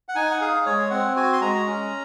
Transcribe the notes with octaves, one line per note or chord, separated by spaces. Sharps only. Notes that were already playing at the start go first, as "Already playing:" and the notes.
F#5
D#4 G#5
F#5
G#4 F5
G#3 C#5
C4 F#5
F#4 G#5
C6
G#3 A#5
C#4